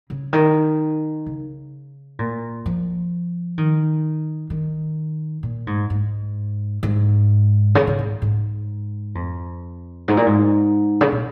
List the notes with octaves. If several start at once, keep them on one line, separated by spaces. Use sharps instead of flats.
C#3
D#3
C#3
A#2
F3
D#3
D#3
A#2
G#2
G#2
G#2
C#3
C#3
G#2
G#2
F2
G#2
A#2
G#2
C#3
A#2